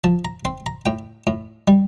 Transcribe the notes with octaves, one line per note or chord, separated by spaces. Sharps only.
F3 A5
A#5
C4 C6
A#5
A2 G5
A2
G3